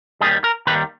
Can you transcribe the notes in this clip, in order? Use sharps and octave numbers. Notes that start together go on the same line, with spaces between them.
D#2 D#3 G3 G#4
A#4
D#2 D#3 G3 B4